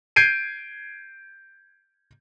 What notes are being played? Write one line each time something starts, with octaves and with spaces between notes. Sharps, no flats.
G6 G#6 C7 D7 D#7